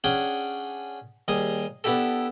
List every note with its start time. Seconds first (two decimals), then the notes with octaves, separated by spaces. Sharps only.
0.04 C#4 D4 G#4 F#5 G5
1.28 D#2 G3 G#4 D#6
1.84 B3 D4 E4 G4 A4